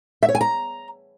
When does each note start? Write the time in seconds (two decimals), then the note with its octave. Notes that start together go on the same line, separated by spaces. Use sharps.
0.23 E5
0.29 C#5
0.35 G#5
0.41 A#5